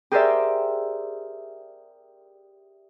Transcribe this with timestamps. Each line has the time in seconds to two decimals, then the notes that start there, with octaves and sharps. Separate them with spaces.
0.12 G4 G#4 A#4 C5 D5 E5